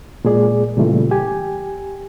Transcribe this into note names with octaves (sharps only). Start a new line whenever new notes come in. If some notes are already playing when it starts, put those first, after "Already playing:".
A#2 G#3 G#4 D5
A#2 C#3 E3 G3 A3 F4
G4 G#5